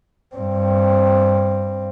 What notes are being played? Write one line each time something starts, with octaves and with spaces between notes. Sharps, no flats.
G2 C4